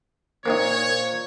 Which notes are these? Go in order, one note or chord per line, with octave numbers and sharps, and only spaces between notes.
A#2 A#3 C4 D#4 C5 C#5